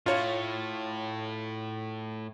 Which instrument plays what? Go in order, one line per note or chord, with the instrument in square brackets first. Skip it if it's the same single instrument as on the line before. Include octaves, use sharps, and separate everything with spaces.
[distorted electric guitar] A2 [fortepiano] F4 C#5